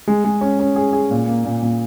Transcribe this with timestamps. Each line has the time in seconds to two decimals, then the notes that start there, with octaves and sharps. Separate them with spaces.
0.07 G#3
0.24 G#3
0.41 C#4
0.59 C#4
0.76 G#4
0.93 G#4
1.11 A#2
1.28 A#3
1.45 A#2
1.62 A#2